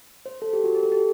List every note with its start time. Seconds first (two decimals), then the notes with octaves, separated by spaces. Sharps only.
0.26 C5
0.42 A4
0.53 G4
0.64 F#4
0.75 G4
0.83 A4
0.92 G4